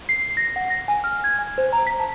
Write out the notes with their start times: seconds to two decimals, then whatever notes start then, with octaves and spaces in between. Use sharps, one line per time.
0.09 C7
0.37 A#6
0.56 F#5
0.70 A#6
0.88 G#5
1.04 F6
1.24 G#6
1.39 G#5
1.58 C5
1.73 A#5
1.87 B6
2.00 A5